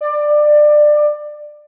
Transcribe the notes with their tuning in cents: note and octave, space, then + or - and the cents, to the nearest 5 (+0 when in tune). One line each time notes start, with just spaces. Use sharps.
D5 +20